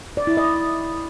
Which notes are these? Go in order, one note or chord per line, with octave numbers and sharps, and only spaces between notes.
D5
E4
D#5